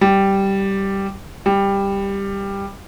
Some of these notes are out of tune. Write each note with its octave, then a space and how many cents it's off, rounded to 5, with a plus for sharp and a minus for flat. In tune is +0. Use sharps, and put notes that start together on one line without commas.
G3 -5
G3 +10